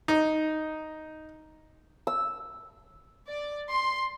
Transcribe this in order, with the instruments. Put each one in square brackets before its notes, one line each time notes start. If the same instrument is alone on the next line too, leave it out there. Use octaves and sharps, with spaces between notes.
[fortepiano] D#4
[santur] E6
[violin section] D5
C6